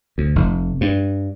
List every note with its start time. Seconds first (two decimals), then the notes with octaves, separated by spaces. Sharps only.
0.18 D2
0.36 F1
0.81 G2